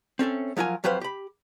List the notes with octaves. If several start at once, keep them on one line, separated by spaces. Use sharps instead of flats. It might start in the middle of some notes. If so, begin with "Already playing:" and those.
C4 C#4 A4 E5
F3 F#3 F4 A#4 G#5
F2 F#3 G4 B4 C5 F5
G4 B5